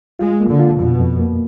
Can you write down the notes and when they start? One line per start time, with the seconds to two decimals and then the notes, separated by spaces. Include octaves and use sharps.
0.19 G#3 F4
0.40 A#3
0.49 D3
0.59 F4
0.79 F2 B2
1.00 F2
1.19 A#3